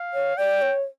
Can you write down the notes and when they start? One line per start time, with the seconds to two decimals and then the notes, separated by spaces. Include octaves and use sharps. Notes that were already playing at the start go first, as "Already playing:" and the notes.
Already playing: F5
0.14 C#5
0.37 D5 G5
0.62 C#5